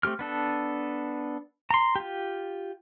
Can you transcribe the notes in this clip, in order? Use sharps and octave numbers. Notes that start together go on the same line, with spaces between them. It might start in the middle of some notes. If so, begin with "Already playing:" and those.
A3 C4 G4 F6
B3 D4 A4
A#5 C6
F4 G4